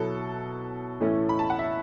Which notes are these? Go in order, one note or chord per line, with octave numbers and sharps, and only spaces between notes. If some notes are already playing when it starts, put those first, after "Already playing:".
Already playing: B2 F#3 B3 E4 A4
A2 E3 A3 C#4 E4
B5
A5
F#5
E5